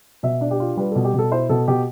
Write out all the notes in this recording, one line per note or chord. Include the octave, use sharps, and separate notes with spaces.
B2 E5
D4
G4
F4
G3 B4
B2 A4
G4
B2
A4
E4 C5
B2 A4
B2 G4